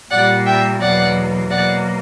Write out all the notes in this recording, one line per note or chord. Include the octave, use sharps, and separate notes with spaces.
A#2 G3 A#3 D5 F#5
E5 G5
E2 B2 F#3 A#3 D5 F#5
B2 F#3 A#3 D5 F#5